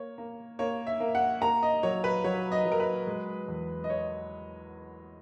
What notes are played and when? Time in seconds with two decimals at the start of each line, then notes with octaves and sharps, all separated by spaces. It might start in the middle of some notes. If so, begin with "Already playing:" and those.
Already playing: A#3 C#5
0.18 A#3
0.59 A#3 C#5
0.87 E5
1.00 A#3
1.15 F#5
1.41 A#3 A#5
1.63 D#5
1.83 F#3 C#5
2.04 B4
2.24 F#3 C#5
2.52 D#5
2.65 F#3
2.72 A#4
2.80 B4
3.07 G#3
3.48 E2
3.84 D#5
3.90 C#5